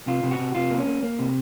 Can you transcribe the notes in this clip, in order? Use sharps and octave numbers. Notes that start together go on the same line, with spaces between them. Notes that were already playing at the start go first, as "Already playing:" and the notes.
C3 F4
C3
F#4
C3
C3 F4
A#3
C#4
A#3
A#3
C3